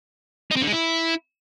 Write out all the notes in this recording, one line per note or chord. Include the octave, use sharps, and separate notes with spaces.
D#4
C4
D3
G#3
E4